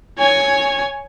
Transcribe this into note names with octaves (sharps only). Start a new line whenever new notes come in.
C#5 G#5